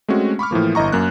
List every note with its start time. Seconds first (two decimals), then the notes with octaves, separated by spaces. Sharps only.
0.08 G#3 A3 C4 C#4 F#4
0.39 B5 C#6 D6 F6
0.51 A2 E3 F3 A#3
0.75 G1 E4 D#5 A#5 C#6
0.92 F#2 A#3 F#6